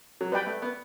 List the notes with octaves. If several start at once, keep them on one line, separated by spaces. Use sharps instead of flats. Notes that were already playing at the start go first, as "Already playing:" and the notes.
F#3
G3 B4 D5 G5 B5
A3
B3